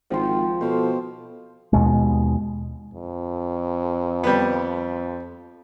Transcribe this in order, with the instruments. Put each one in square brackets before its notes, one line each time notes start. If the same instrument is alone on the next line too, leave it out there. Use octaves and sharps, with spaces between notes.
[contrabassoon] G#1 [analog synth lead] F3 [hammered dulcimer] F#5 G5 C6
[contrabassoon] B2 [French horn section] A4 [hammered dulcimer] C5 F5
[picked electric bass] D#2 B2 G#3
[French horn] F2
[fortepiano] G3 B3